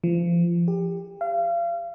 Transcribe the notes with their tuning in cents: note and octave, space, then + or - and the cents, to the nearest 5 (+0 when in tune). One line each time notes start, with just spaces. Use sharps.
F3 -30
G4 +25
F5 -35